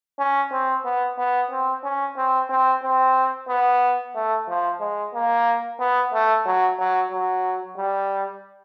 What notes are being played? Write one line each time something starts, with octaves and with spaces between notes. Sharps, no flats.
C#4
C4
B3
B3
C4
C#4
C4
C4
C4
B3
A3
F3
G#3
A#3
B3
A3
F#3
F#3
F#3
G3